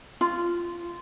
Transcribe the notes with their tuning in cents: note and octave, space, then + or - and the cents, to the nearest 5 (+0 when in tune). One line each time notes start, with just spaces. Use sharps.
F4 -15